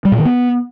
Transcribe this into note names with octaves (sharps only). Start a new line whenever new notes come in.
G3
A#2
D#3
B3